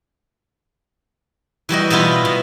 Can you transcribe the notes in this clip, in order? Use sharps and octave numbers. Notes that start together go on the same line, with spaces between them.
E3 G3 F#4 D#5
B2 G3 B3 E4 F4
B2